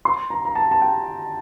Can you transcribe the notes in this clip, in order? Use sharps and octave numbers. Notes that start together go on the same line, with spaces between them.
C6
A#5
A#5
A5
A5
G5